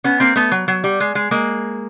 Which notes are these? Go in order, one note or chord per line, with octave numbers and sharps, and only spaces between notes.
B3 C#4
A#3 C4
A3 B3
F#3
F#3
G3
G#3
G#3
G#3 A#3